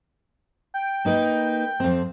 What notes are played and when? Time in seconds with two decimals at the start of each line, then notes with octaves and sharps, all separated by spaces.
0.74 G5
1.05 A#3 D#4 B4
1.80 F2 C4